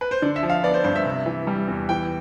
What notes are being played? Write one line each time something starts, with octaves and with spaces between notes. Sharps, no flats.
B4
C5
D3 D5
E5
F3
F5
B3 D5
C5
G2 C5
E5
C3
E3
G3
E2
E3 G5